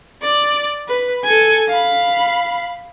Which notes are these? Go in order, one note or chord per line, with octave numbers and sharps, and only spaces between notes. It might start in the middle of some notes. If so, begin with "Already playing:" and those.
D5
B4
A4 G#5
F5 B5